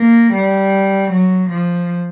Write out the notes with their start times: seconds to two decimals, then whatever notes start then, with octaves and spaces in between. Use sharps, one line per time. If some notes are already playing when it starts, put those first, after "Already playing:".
Already playing: A#3
0.33 G3
1.11 F#3
1.50 F3